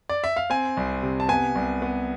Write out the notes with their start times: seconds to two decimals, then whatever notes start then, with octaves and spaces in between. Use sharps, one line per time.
0.09 D5
0.24 E5
0.37 F5
0.50 C4 G#5
0.77 C2
1.03 C3
1.20 A5
1.29 B3 G#5
1.55 C2
1.82 B3